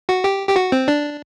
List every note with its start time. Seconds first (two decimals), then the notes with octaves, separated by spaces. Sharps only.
0.09 F#4
0.24 G4
0.49 G4
0.56 F#4
0.72 C4
0.88 D4